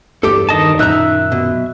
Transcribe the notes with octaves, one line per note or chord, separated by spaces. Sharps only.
E2 G2 G4 A4
D#3 D#5 A5
F#2 A#2 D#3 D#4 E5 A#5 E6 F#6
B2